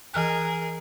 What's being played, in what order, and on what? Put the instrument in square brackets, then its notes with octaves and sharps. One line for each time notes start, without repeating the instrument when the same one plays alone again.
[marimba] E3 F6 F#6 [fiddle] G#4 A#4